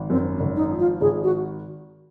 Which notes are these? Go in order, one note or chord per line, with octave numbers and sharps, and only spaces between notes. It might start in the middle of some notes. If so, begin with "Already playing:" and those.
Already playing: G#1
F#2 C4
G#1
D#4
F3
F4
G#1 G#4
F#4